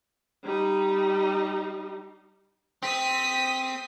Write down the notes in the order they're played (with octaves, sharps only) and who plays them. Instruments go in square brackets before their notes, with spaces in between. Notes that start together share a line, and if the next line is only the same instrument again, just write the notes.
[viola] G3 D#4
[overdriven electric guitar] C4 [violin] D#6 B6